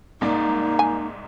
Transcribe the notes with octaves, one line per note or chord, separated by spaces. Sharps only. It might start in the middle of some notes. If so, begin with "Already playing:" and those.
C2 G#2 A#3 D#4 D5
G#5